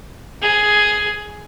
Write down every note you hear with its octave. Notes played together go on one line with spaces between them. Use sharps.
G#4